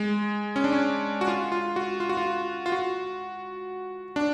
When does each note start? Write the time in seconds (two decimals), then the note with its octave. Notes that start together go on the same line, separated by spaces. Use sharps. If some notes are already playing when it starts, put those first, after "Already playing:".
Already playing: G#3
0.56 C#4
0.64 D4
0.72 C#4
1.21 F#4
1.28 F4
1.52 F4
1.76 F#4
2.00 F4
2.09 F#4
2.17 F4
2.66 F4
2.72 F#4
4.16 D4